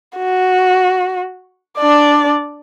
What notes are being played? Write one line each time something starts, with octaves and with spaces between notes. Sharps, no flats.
F#4
D4 D5